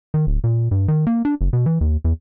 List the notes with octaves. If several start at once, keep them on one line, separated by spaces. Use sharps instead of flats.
D#3
D1
A#2
G2
D#3
A#3
D4
F#1
B2
E3
D#2
E2